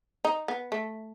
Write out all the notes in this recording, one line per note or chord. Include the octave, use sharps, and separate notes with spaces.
D#4
B3
A3